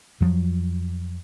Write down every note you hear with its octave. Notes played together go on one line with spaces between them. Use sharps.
F2 F3 F#3